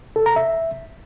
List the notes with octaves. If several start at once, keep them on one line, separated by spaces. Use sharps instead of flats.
A4
A#5
E5